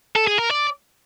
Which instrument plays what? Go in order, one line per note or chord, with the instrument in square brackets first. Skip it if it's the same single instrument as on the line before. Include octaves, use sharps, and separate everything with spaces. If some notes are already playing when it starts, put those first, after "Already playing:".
[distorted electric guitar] A4
G#4
A#4
D5